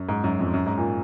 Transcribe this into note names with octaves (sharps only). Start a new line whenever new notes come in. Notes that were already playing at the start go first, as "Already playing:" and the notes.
Already playing: F#2
G#2
F#2
F2
F#2
G#2
A#2